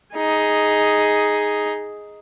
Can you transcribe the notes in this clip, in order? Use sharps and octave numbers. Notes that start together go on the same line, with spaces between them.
D#4 G#4